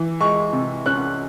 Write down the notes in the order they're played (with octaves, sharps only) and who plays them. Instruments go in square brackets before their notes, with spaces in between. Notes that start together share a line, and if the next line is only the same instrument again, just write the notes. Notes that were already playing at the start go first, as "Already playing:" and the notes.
Already playing: [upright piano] E3
G#3 C#6
C3
C#4 F#6